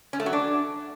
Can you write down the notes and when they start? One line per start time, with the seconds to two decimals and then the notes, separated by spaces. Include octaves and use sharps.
0.13 C#4
0.20 A3
0.26 F#3
0.33 D4